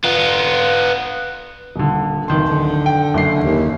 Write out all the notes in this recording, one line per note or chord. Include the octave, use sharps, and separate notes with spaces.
B3 F4
D#1 D3
D1 D#3 C6
D3
G5
F#1 C7
D#2